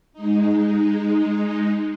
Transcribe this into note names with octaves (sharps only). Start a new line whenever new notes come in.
G#3 D#4